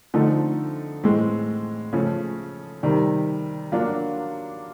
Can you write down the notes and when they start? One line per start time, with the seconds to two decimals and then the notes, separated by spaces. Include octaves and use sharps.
0.14 D3 F3 A3 C4 D#4
1.04 A2 E3 G#3 C4
1.93 C#3 F3 A3
2.83 C3 D#3 G3
3.72 F#3 A#3 D4 F4